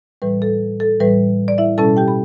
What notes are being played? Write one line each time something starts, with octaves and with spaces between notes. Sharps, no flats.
A2 E3 G3 B4
A4
A4
A2 E3 G3 B4
D5
E4 E5
B2 G3 C#4 E4 A4 A5
G4 G5
B5